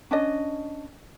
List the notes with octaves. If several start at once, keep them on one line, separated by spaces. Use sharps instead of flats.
C#4 D4 D#5